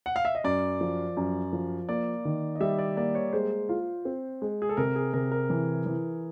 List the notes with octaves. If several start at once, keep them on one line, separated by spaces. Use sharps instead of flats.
F#5
F5
E5
D#5
F#2 D5
F3
F#2
F3
A#3 D5
D#3
D#5
G3 E5
D5
A#3 D5
C#5
G#3 C5
F4
C4
G#3
G#4
A4
C3 A#4
G#4
C3 A#4
A#4
E3
E3